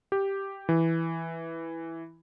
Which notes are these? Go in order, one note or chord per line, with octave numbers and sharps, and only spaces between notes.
G4
E3